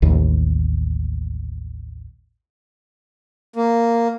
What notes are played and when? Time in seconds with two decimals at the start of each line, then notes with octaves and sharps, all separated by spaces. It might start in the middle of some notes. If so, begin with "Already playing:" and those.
0.02 A1 D#2
3.56 A#3